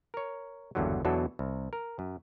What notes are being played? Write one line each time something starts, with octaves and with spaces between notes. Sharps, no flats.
A#4 C#5
G#1 E2 G2 D3 F#3
E2 B2 F#3 D4 A4
C2
A#4
F#2